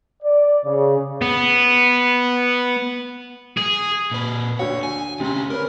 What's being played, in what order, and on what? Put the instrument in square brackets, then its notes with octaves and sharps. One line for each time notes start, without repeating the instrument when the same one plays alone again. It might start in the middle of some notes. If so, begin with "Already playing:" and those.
[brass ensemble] D5
C#3
[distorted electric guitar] B3
G#4
[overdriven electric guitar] A#2 B4
[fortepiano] D2 F#4 [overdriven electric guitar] C#5
[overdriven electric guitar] G#5
[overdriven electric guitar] D2 C#4 [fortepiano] C3
[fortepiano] C#4 B4 [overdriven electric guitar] A#4